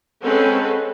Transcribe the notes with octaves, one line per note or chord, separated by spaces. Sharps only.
G#3 C4 C#4 A4 B4 F#5